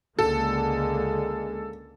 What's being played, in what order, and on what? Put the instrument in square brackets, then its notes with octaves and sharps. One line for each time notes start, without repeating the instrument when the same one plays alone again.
[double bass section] C#2 D3 A#3 [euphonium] G#3 [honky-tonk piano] A4